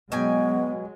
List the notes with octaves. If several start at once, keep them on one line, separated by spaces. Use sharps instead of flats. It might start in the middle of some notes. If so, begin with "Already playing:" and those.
B2 F#3 G#3 B3 G5 G#5